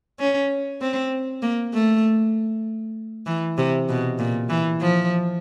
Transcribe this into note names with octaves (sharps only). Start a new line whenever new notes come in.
C#4
C4
A#3
A3
E3
C3
B2
A#2
E3
F3